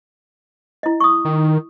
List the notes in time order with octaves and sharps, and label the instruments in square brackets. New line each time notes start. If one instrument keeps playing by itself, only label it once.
[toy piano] E4 D#5
C#6 D#6
[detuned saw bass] D#3